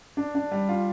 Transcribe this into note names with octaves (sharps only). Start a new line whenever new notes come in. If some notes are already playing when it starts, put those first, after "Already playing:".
D4
D4
G3
F4